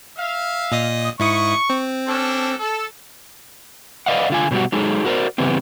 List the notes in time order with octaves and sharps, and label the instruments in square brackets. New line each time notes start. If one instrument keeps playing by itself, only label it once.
[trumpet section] E5 F5
[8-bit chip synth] A#2 D#5 D#6
[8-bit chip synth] G#2 E4 D#6 [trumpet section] C#6
[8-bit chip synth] C4
[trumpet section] C#4 D4 A4
A4
[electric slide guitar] B4 D5 D#5 F5 F#5
D3 F4 G#5
B2 D#3 F#3 G3 F#4
F#3 G#3 D#4 G#4 A4
F#4 A#4 C5 D5
C#3 E3 G3 B3 C4